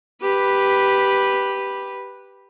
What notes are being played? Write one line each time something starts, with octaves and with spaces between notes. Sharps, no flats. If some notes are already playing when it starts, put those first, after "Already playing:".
G4 B4